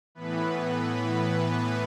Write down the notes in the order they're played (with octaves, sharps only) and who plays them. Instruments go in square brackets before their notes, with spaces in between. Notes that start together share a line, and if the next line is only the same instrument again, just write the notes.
[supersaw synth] A2 E3 B3 B4